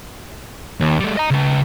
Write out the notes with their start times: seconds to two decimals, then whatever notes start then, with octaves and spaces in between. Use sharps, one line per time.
0.80 D#2
1.00 G3 A3
1.17 D#5 A#5
1.31 C#3 B4